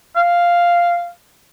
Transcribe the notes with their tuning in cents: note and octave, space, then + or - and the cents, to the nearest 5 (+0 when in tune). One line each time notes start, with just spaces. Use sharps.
F5 -5